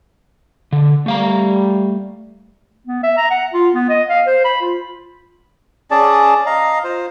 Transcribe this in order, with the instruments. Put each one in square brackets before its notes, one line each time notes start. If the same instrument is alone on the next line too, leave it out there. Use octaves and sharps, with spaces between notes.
[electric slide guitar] D3
[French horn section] G3 [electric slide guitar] A3 F5 A#5
[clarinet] B3
E5
A#5
F#5
F4
B3
D#5
F5
C5
B5
F4
[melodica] C#4 G#4 D5 A5
D#5 F5 A#5
F4 C5